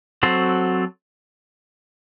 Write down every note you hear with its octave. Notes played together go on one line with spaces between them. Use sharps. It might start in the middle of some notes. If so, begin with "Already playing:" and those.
F#3 C4 F#4 A4 C5